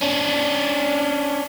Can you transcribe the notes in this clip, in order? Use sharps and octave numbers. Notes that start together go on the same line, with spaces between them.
C#4 D4